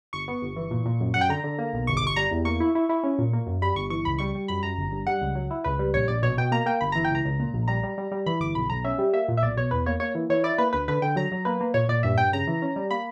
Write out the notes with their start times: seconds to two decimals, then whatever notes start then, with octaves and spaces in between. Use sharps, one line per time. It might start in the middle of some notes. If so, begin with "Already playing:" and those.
0.13 G1 C#6
0.28 B3
0.42 G1
0.56 E3
0.71 A#2
0.85 A#2
1.00 F#2
1.14 F#2 F#5
1.21 G5
1.29 D3 A#5
1.44 D3
1.59 A#3
1.73 B1
1.87 G1 C#6
1.97 D6
2.01 G1
2.07 C#6
2.16 G3 A#5
2.31 E2
2.45 A#3 C#6
2.60 E4
2.75 E4
2.89 E4
3.03 C#4
3.19 A#2
3.33 A#3
3.47 F#2
3.62 G3 B5
3.76 G1 C#6
3.90 E3 C#6
4.05 C#2 B5
4.19 G3 C#6
4.35 G3
4.48 F#2 B5
4.63 F#2 A#5
4.78 G1
4.92 G2
5.07 G3 F#5
5.22 C#2
5.35 F#3
5.51 E4
5.64 C#2 B4
5.79 G3
5.94 A#1 C#5
6.08 A#1 D5
6.22 B2 C#5
6.37 B2 G5
6.52 A#3 A#5
6.66 A#3 G5
6.81 G1 B5
6.92 E3 A#5
7.04 G5
7.11 C#2 A#5
7.25 C#2
7.40 A#2
7.54 A#1
7.68 G3 A#5
7.83 G3
7.98 G3
8.11 G3
8.26 E3 B5
8.40 G1 D6
8.55 B1 B5
8.69 B1 A#5
8.84 C#4 E5
8.98 G3
9.13 A#3 E5
9.28 A#2
9.37 E5
9.42 B1 D5
9.57 B2 C#5
9.71 E2 B4
9.86 A#3 C#5
10.00 A#3 C#5
10.15 E3
10.30 E3 C#5
10.44 E4 D5
10.58 A#3 B4
10.73 D2 B4
10.88 D3 B4
11.02 D3 G5
11.16 F#3 A#5
11.32 F#3
11.45 A#3 B4
11.61 A#3
11.74 A#2 C#5
11.89 A#2 D5
12.03 G2 E5
12.18 G2 G5
12.33 C#3 A#5
12.47 E3
12.62 C#4
12.76 G3
12.91 A#3 B5